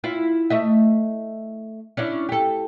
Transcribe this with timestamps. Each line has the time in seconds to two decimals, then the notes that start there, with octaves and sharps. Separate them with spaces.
0.04 E4 F4 F5
0.50 A3 D#5 E5
1.97 C#4 D4 E4
2.29 G4 A4